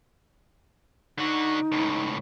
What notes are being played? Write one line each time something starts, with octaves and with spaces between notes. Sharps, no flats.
D3 D#4 F#4
C#2 A2